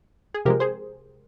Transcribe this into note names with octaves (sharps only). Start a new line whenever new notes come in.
G#4
C3 F3 G#3 G4 A#4
G#4 C5